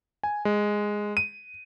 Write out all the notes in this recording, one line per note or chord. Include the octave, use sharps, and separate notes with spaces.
G#5
G#3
D#7